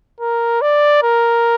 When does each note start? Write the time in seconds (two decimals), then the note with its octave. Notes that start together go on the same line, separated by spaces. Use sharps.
0.20 A#4
0.62 D5
1.03 A#4